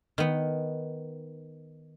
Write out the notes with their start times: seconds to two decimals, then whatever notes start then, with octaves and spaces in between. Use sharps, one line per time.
0.18 D#3 B3